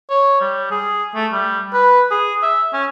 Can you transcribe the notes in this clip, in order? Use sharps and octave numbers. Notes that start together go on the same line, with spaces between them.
C#5
G3
G#4
A3
G3
B4
G#4
E5
C#4